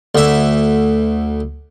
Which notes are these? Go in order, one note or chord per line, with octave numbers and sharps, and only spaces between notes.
D2 E5